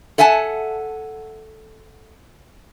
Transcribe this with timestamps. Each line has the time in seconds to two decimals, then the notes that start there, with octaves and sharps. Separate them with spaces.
0.18 A4 E5 F#5 G#5 A5